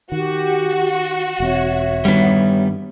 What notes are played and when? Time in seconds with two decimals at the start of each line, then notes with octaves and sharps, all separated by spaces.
0.12 D#3 F#4 G4
1.40 E1 C4 C#5 E5
2.05 G2 D#3 G3 B3